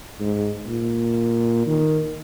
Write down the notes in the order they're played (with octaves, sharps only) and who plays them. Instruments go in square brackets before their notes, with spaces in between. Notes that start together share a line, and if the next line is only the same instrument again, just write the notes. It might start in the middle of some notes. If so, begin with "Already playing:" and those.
[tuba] G#2
A#2
D#3